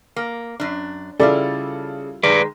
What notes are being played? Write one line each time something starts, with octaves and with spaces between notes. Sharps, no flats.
A#3
F#2 D4
C#3 G3 E4 F4 A4 D5
D#3 G#3 B4 D5